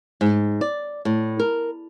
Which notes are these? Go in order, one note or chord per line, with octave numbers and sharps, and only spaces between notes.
G#2
D5
A2
A#4